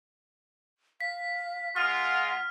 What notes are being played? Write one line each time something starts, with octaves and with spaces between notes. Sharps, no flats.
F5 B6
G#3 F4 F#5 F6